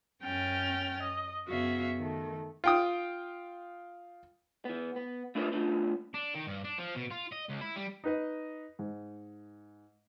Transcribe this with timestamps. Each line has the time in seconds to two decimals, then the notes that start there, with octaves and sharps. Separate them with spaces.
0.22 F#2 C#4 G5 F6 A6
1.02 D#5
1.47 F#2 C#3 B3 F#4 E5 F5
1.98 D#3 A3
2.64 F4 G5 D#6
4.65 E3 B3
4.96 B3
5.35 A3 D4 E4 F4 A#4 B4
5.53 A3 B3 D4 F4
6.14 D4
6.34 D#3
6.47 G2
6.64 D4
6.78 F3
6.96 B2
7.11 F4
7.33 D#5
7.49 C#2
7.61 E4
7.76 G3
8.04 D#4 B4 D#5
8.79 G#2